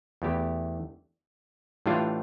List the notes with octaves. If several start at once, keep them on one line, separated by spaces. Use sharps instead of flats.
E2 E3 A3 E4 G4
A2 E3 G3 D4 F4